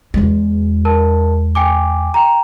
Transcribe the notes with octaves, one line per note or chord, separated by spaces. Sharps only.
E2 G#3
A#4 A5
G5 G#5 D6
G5 A#5